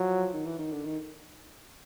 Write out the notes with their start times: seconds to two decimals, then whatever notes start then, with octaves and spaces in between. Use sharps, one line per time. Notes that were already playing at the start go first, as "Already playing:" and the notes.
Already playing: F3 F#3
0.33 D#3
0.46 E3
0.59 D#3
0.72 D3
0.85 D#3